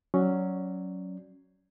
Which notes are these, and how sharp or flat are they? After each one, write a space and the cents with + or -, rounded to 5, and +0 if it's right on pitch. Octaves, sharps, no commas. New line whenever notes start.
F#3 +0 C#4 +0 D5 -10